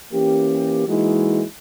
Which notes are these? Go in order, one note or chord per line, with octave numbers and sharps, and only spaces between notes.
E3 A#3 C#4 G4
E3 G#3 A#3 D#4 E4 F#4